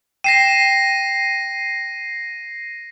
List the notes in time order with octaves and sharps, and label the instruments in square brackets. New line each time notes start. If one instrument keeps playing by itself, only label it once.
[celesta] G5 E7 [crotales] A#6 C7 D#7